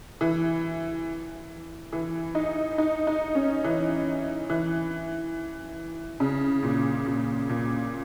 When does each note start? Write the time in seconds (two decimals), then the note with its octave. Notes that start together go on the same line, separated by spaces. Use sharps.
0.21 E3
1.93 E3
2.35 D#4
2.78 D#4
3.07 D#4
3.35 C#4
3.64 E3
4.50 E3
6.20 C#3
6.63 A#2
7.06 A#2
7.50 A#2